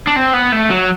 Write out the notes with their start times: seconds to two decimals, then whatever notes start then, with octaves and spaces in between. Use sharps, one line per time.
0.07 D4
0.16 C4
0.34 B3
0.52 A3
0.70 F#3